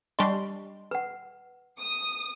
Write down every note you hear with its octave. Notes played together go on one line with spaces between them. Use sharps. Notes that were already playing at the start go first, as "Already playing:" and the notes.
G3 D4 D#5 C6 C#6
B4 F#5
D#6